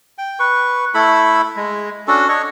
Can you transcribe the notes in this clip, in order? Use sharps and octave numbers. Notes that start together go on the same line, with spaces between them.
G5
B4 C#6
A3 E4 A4 B5
G#3
C#4 D4 F#4 A4
D4 C#5 D#5 C#6